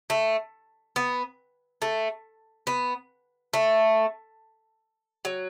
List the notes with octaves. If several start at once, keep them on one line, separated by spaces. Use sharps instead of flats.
A3
B3
A3
B3
A3
F#3